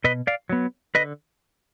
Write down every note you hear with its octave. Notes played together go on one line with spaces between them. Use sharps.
B2 B4 D#5
D5 F5
F#3 B3
D3 B4 D#5